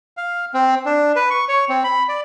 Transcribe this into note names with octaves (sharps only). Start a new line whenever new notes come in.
F5
C4
D4
B4
C#6
C#5
C4
B5
D5